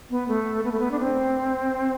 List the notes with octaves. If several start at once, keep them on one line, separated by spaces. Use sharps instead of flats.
B3
A3
B3
A3
B3
D4
C4